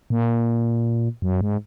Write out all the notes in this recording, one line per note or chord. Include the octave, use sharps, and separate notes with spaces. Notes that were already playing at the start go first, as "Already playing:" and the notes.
A#2
F#2
G#2